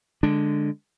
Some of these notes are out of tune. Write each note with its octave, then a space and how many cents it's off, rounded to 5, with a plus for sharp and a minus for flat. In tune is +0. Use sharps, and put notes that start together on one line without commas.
D3 +0 G#3 -10 D4 +0